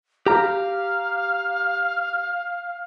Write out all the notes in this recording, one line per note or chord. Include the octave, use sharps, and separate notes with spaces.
G4 F5 A#5